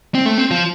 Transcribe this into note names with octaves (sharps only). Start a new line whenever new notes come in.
C4
A3
C4
F3